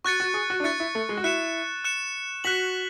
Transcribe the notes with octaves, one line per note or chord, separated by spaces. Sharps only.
F#4 C#6 F#6 A6 C#7
F#4
G#4
F#4
D4
E4 C#6 F#6 A6 C#7
E4
A3
G#3
F#4
E4 F#6 C#7 E7
F#6 C#7 E7
F#4 F#6 B6 F#7